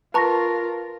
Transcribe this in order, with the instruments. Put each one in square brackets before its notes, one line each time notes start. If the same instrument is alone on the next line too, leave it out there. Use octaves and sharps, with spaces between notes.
[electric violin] F4 A#4 [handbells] B4 A#5 C#6 [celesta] A5 A#6